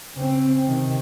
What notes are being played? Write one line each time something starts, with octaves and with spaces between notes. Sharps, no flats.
C#3 C4
C3 D#3